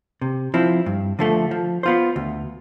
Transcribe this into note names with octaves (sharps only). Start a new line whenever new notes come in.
C3
F3 C4 E4
G2
D3 F3 A3
F3
B3 F4 C5
D2